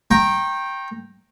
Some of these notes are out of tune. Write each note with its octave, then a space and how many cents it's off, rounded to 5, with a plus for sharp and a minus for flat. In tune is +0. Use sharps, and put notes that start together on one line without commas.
G5 +0 A#5 +0 C#6 -35